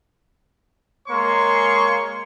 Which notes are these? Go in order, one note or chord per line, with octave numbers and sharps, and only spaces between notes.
G#3 A#3 C#5 C6 C#6